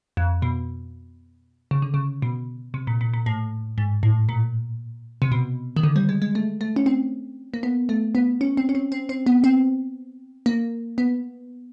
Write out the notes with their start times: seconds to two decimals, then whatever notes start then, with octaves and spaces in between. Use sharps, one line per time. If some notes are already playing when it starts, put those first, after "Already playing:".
0.17 F2
0.42 B2
1.71 C#3
1.82 D3
1.94 C#3
2.22 B2
2.74 C3
2.87 A#2
3.01 A#2
3.14 A#2
3.26 A2
3.78 G#2
4.03 A2
4.29 A#2
5.22 C3
5.32 B2
5.77 D#3
5.83 D3
5.96 G3
6.09 G#3
6.22 G#3
6.35 A3
6.61 A3
6.76 C#4
6.86 C4
7.54 A#3
7.63 B3
7.89 A3
8.15 B3
8.41 C#4
8.57 C4
8.69 C#4
8.75 C4
8.92 C4
9.09 C4
9.26 B3
9.44 C4
10.46 A#3
10.98 B3